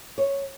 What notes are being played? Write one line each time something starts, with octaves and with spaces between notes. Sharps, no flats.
C#5